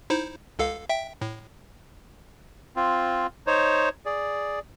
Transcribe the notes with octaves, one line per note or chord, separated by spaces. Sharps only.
D#4 E4 C5
C#2 A4 F5
E5 G5
A2
C4 F4
D#4 C5 C#5
G#4 D5